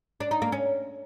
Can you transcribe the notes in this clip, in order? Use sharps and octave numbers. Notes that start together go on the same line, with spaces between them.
D4
D#4
A#3
C#4